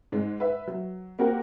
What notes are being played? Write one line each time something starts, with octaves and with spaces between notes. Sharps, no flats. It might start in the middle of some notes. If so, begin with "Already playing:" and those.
G#2 G#3
B4 E5
F#3
A#3 C4 F#4 G4 A#4